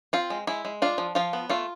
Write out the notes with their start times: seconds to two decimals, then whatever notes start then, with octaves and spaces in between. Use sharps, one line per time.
0.13 C4 F4
0.30 G#3
0.47 G#3 E4
0.65 G#3
0.82 D4 F4
0.98 F3
1.15 F3 F4
1.33 B3
1.49 A3 F4